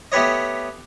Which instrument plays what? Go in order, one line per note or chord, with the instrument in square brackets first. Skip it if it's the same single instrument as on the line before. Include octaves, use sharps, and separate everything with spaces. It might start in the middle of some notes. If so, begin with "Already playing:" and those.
[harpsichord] A3 B3 G4 B4 C#5 D#5